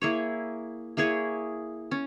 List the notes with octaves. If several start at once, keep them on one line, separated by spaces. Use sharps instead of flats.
A#3 E4 G#4 C#5
A#3 E4 G#4 C#5
C#4